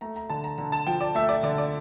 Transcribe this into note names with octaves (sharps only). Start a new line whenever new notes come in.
A3 A#5
A#5
D3 A5
A#5
D3 A#5
A5
F3 G5
D5
A3 E5
D5
D3 D5
D5